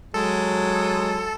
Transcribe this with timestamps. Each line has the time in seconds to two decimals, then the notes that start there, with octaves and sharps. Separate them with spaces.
0.14 F#3 G#3 A4